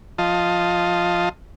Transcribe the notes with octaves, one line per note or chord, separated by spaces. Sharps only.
F3 F4 D#5 A5